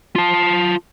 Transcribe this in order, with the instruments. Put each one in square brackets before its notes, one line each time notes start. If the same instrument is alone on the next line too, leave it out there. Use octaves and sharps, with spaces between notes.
[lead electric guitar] F4 A5